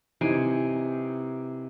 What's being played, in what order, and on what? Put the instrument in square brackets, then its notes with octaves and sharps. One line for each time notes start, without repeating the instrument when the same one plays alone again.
[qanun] C3 G#5 [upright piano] E3 D#4 D7